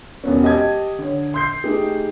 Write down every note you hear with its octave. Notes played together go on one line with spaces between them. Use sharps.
E1 B3 C#4
G4 D#5 A5 G#6
D3 C#5
C6 G6 C7
A3 D#4 G4 G#4